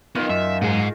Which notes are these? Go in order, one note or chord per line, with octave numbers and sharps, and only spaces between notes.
D#3 B3 D#4 F4
F#2 E5
G#2 G#4 D#5 F#5